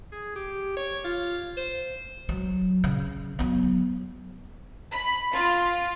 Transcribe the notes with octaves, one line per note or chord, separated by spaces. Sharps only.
G#4
G4
C#5
F4
C5
F#3
C#3
F#3 B3
B5
F4